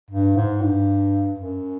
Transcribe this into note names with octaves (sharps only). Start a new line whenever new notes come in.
G2
G#2
G2
F#2